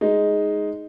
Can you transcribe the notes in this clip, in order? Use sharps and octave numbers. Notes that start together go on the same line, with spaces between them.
G#3 D#4